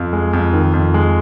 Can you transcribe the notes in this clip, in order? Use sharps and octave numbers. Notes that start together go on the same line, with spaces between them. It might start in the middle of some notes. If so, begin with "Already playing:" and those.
Already playing: F2
G#3
F2
D#3
F2
G#3